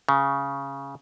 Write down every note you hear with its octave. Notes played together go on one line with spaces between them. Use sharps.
C#3